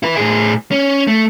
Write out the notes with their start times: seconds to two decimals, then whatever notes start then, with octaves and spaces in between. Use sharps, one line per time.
0.03 E4 B4
0.17 A2 G#4
0.71 C#4
1.07 A3